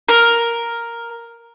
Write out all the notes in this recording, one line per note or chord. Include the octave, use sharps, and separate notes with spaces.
A#4